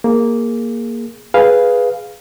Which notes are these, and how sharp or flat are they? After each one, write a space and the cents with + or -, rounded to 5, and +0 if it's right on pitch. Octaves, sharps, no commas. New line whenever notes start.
A#3 +0 G#4 +0
G#4 +0 B4 +0 F5 +0